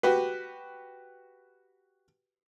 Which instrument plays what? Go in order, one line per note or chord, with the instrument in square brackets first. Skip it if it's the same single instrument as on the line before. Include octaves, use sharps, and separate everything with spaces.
[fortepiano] F#4 G4 B4